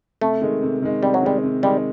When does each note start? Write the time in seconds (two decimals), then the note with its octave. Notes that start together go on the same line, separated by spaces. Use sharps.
0.21 C3 A3
0.41 D#3 G#3
0.62 C3
0.82 D#3 G#3
1.03 C3 G3
1.14 F#3
1.23 D#3 G3 G#3
1.43 C3
1.63 D#3 G3 G#3